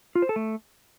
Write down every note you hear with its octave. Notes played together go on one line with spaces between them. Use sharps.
F4
C5
A4
A3